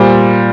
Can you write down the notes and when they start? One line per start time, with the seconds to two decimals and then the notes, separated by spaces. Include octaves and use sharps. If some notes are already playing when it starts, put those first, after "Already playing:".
Already playing: A#2 G3 C5